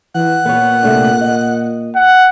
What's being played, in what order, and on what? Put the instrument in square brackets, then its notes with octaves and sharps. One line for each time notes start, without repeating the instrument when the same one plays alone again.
[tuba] E3 [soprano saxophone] F#5
[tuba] A#2 [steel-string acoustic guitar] B3 C#5
[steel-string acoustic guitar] C3 A3 D4
D#5
[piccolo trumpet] F#5